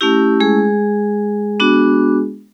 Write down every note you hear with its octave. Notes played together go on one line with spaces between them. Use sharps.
A3 C#4 E4 G4
G#3 G#4
B3 D4 F#4